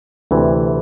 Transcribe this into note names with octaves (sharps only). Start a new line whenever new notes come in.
D2 C3 E3